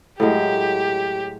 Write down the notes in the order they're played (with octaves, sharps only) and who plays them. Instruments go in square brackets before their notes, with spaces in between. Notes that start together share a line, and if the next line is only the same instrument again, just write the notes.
[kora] A2 F#3 G#3 [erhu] G4